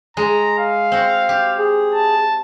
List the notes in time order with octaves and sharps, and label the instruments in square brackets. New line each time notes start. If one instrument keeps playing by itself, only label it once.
[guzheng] G#3 [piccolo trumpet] A#5
[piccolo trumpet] F5
[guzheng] C4 F#4
G4
[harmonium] G#4
[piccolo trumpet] A5